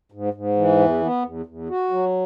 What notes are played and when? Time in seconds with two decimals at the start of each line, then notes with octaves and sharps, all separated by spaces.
0.12 G#2
0.33 G#2
0.56 E3
0.79 E2
1.01 B3
1.23 E2
1.46 E2
1.69 F#4
1.90 F#3